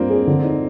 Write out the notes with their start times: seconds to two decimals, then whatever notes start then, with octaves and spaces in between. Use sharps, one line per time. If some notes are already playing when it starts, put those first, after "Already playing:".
Already playing: G3 A#3 C4 D4 F4
0.10 G#4
0.27 D3
0.44 D#4